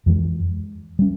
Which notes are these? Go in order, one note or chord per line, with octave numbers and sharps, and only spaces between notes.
F2 E3 G#3
G3 C#4